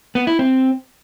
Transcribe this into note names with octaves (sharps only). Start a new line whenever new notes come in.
B3
E4
C4